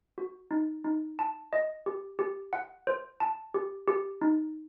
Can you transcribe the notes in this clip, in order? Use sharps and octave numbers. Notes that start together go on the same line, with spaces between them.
F#4
D#4
D#4
A5
D#5
G4
G4
F#5
C5
A5
G4
G4
D#4